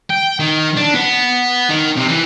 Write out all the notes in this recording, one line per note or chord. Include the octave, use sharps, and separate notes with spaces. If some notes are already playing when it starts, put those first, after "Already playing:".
G5
D#3
D4
B3
D#3
C3
E3